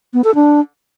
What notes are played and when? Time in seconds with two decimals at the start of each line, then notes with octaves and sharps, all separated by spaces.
0.14 B3
0.24 A4
0.35 D4